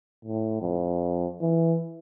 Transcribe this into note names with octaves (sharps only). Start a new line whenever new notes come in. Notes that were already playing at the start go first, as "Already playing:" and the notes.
A2
F2
E3